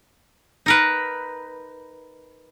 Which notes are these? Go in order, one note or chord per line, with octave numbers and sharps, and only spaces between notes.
D#4 A#4 B4